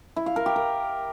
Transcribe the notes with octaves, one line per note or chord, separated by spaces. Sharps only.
E4
F5
A#4
G4
A#4